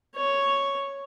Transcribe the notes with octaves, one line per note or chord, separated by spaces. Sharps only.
C#5